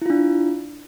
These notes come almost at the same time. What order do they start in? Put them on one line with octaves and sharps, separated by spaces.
E4 F4 D4